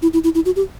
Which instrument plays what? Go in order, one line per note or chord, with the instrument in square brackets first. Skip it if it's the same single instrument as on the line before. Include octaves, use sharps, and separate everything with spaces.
[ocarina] E4
E4
E4
E4
F#4
G4